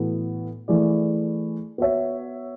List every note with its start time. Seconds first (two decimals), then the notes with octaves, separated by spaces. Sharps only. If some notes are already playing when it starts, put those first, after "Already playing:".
Already playing: A2 E3 B3 F#4 A4
0.68 E3 A3 E4 G#4 D5
1.78 B3 F#4 C#5 E5